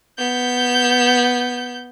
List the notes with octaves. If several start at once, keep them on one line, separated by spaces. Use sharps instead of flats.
B3 G6